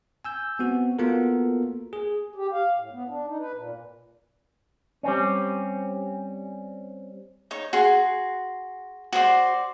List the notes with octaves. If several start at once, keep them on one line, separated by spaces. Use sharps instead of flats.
G#5 E6 G6
B3 C4 F#4
A#3 B3 F4 F#4 A4 A#4
G#4
G4
F5
A2
B3
D4
D#4
B4
A#2
G3 C4 C#4
D#4 C#5
F#4 G#4 C6
F#4 C5 D5 C6